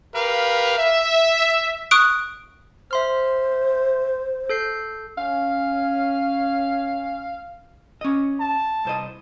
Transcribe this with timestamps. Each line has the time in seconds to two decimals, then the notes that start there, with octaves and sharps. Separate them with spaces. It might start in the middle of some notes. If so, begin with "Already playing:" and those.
0.14 G4 A#4 B4 F5
0.78 E5
1.91 C#6 D#6 F#6 D7
2.91 C5 E5 C6 F6
4.50 A4 G6 C7
5.18 C#4 F5
8.01 C#4 D#5
8.39 A5
8.85 C2 C5 D#5